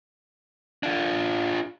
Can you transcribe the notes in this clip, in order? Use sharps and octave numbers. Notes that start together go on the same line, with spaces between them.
D4 F4